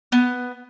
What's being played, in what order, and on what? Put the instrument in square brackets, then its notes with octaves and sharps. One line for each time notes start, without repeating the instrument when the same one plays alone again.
[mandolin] B3